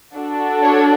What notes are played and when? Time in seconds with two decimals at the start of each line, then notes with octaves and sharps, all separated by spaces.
0.15 D4 F#4 A4
0.63 C#5